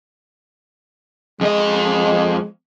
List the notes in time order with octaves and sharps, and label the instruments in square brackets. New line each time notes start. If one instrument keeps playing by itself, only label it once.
[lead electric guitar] F2 D#5 [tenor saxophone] G#3